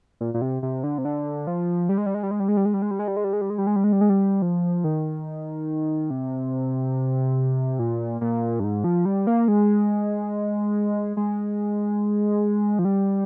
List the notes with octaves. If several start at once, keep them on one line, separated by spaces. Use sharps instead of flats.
A#2
A#2
C3
C3
D3
C3
D3
F3
G3
G#3
G3
G#3
G3
G#3
G3
G#3
G3
G#3
G3
G#3
G3
G#3
G3
G#3
G3
G#3
G3
G#3
G3
G#3
G3
G#3
G3
G#3
G3
F3
D#3
C3
A#2
A#2
G2
G#2
F3
G3
A#3
G#3
G#3
F3
G3